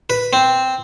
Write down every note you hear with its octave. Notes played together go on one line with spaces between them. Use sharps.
B4
C4